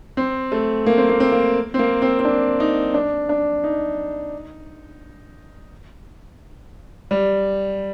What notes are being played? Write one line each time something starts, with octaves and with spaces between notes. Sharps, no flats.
C4
A3
A#3
C4
A#3
C4
A#3
C4
A#3
C4
C4
D4
D#4
D4
D4
D#4
G3